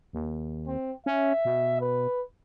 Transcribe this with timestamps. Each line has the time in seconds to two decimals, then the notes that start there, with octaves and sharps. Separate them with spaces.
0.13 D#2
0.67 C4
1.06 C#4 E5
1.45 B2
1.81 B4